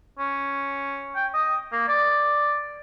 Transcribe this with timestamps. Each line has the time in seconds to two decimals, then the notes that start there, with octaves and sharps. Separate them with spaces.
0.19 C#4
1.16 G5
1.34 D#5
1.72 A#3
1.88 D5